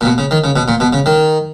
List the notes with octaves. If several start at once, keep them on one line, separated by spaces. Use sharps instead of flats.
A#2
B2
C#3
D#3
C#3
B2
A#2
B2
C#3
D#3